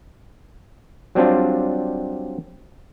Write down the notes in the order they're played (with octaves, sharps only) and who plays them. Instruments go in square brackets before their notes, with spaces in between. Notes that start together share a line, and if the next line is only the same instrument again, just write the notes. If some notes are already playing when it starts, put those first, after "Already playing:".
[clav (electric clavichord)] F#3 G3 C4 D4 F4